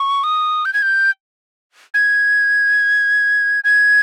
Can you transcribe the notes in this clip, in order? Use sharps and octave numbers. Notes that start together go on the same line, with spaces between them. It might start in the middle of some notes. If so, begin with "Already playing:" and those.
Already playing: C#6
D#6
G6
G#6
G6
G#6
G#6